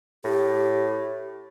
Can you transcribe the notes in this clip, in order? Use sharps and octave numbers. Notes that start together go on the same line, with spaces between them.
A2 G4